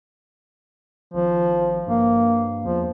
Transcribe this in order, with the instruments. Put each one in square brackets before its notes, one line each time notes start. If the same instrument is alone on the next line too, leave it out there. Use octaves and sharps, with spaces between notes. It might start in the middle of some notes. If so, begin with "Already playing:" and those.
[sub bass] G#1 [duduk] F3
[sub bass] G2 [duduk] A#3
[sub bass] E2 [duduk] F3